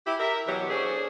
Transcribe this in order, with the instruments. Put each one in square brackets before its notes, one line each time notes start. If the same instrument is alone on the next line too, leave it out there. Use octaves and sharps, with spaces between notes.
[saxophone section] E4 G4
A#4 E5
B2 E3 F#3 G4
C#4 D4 G#4 A4 C5